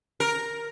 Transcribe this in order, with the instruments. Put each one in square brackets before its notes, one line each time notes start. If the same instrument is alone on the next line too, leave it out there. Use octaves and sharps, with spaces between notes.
[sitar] A#4